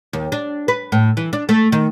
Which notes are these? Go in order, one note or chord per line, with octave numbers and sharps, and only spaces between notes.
D#2
D4
B4
A2
E3
D4
A3
D#3